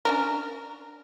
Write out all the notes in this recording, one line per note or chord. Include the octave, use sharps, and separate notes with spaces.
C#4 D4 A#4